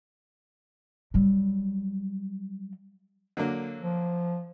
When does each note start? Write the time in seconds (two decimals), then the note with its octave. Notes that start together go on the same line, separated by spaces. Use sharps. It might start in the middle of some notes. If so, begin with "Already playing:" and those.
1.14 F#3 G3
3.37 D3 F#3 A#3
3.81 F3